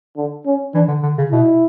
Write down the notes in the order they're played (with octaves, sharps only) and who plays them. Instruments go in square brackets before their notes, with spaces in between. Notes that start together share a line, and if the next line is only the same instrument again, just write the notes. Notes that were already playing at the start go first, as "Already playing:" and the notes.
[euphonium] D3
C#4
[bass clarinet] E3 [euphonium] D4
[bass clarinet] D3
D3
C#3
[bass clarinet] B2 [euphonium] E4